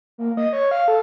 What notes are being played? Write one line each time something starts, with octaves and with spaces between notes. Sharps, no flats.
A#3
D#5
C#5
F5
A4